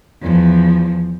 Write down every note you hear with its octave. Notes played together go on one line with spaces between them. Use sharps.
E2 F3